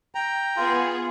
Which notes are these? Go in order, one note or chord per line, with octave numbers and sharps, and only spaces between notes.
G5 A#5
B3 F4 G#4